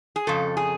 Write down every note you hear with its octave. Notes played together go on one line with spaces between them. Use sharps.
G#4
F2 C#3 A4
G#4